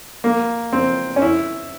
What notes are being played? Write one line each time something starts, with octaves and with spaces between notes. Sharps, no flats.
A#3
C4
C#4
E4